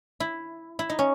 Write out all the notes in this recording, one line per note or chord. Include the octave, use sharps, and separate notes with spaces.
E4
E4
D#4
C#4